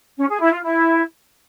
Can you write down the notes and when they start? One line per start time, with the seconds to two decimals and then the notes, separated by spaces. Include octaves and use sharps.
0.18 C#4
0.29 G#4
0.40 E4
0.51 F4
0.62 E4